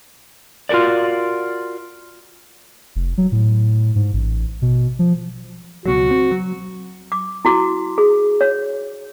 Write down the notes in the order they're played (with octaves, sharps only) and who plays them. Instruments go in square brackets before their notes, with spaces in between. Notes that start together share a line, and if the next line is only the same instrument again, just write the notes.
[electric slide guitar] F4 F#4 A4 A#4 D5
[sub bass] F1
F#3
A2
G#2
A1
B2
F3
[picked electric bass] C#2 B2 F#3 [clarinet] F#4
[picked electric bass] C4
F#3
[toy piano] D6
E4 F#4 D6
G#4
C#5